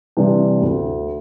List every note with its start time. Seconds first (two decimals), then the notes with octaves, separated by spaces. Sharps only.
0.17 C3 E3 G3 D4
0.62 D2